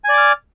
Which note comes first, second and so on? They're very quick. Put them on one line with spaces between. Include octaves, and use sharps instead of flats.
G#5 D5 D6 F6